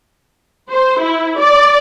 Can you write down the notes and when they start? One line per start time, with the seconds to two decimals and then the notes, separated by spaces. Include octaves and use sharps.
0.71 C5
1.02 E4
1.40 D5